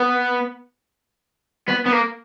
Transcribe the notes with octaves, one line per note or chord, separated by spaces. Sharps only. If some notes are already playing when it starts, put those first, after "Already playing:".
Already playing: B3
B3
B3
A#3